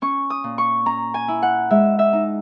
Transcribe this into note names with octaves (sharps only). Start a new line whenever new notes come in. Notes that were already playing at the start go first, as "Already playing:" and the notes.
C#4 C#6
D#6
A#2
C#6
C#4 A#5
G#5
E4
F#5
G#3 E5
E5
D#4